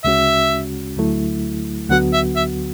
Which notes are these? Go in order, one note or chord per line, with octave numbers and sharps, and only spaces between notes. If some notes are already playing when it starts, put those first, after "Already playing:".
D2 C#3 G#3 C#4 F#4 E5
D2 D3 F#3 A3 E4
D2 D3 F#3 B3 F#4 F#5
E5
E5